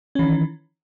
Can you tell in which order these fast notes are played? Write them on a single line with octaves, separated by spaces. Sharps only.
C#4 E3 D#3